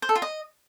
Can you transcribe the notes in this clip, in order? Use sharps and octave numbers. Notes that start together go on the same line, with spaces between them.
C5
A4
F4
D#5